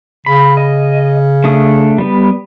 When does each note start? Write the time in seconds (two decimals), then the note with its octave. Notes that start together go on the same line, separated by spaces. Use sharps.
0.26 C#3 B5
0.57 D#5
1.44 A3 D4 D#6
1.98 G3 B3